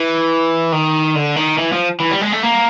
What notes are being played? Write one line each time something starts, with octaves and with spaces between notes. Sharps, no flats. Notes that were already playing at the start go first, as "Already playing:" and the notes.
Already playing: E3
D#3
D3
D#3
E3
F3
E3
G3
G#3
A3
A#3